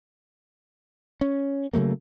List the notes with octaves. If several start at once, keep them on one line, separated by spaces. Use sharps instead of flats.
C#4
C#3 F#3 A3 A#3